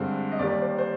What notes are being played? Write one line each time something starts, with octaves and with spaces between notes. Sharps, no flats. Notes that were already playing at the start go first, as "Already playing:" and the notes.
Already playing: G2 D3 G#3 C4
D#5
D#2 D#3 G3 D5
C5
C5